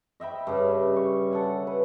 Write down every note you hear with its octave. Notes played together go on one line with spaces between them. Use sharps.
D#5 E5 G5 B5
G2 C#3
C#6
A4 F#5 G#5
B4